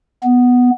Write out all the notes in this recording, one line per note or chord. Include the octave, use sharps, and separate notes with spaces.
B3